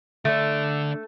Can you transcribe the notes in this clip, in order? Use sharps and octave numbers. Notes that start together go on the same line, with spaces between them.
D3 A3 D5